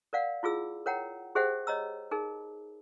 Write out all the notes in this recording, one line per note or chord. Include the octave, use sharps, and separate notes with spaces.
A#4 D5 F5 F#5
E4 F4 G#4 E6
A#4 C#5 F#5 G5 A#5
G4 G#4 C5 E5 F#5 G5
C#5 D#5 A#5 E6
D#4 G#4 A#4